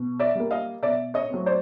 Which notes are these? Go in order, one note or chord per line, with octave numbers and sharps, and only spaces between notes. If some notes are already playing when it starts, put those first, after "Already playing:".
Already playing: B2
D5 E5
G3 A#3
D#5 F5
B2 D5 E5
C#5 D#5
F#3 A3 C4
C5 D5